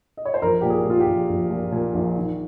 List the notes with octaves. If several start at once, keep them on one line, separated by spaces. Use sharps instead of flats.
D#5
C#5
C5
A#1 A#4
A#2 G4
G#4
A#2
F4
G4
A#1
A#1
A#2
A#2
A#1
D#3